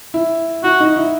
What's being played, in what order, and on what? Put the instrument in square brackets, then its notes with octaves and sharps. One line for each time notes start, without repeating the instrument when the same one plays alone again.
[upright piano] E4
[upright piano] E4 [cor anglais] F#4
[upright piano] D#4
E4